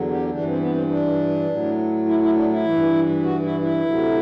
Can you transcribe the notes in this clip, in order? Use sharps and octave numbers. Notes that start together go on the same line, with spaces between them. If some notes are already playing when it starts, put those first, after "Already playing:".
Already playing: E2 D3 F#3
G4
G2 E3 D4
C4
B3
C4
D4
A2 F#3
E4
E4
D4
E4
G2 E3
F#4
E4
E4
D2 C3 F#3